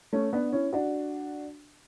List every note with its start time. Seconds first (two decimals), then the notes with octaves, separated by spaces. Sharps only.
0.13 A3 C#4
0.33 B3 D4
0.53 C#4 E4
0.73 D4 F#4